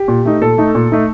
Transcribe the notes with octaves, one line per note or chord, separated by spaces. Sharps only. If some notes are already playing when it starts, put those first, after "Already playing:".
Already playing: G4
A#2
A3 D#4
A#2 A4
A3 D#4
A#2
A3 D#4